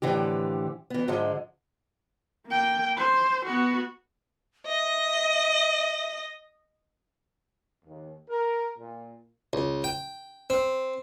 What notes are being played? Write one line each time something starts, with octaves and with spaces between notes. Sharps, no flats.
A2 D3 E3 F3 G4
E3 B3
G#2 D3 F3 G#3
A#3 G5
C5
B3 F#4
D#5 E5
D#2
A#4
A#2
C#2
G5
C4